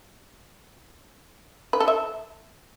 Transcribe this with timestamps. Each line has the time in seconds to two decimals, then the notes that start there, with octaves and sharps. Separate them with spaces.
1.73 B4
1.80 A4
1.88 E5